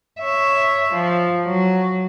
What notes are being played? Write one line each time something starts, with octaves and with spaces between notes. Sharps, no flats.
C#5 E5
F3
F#3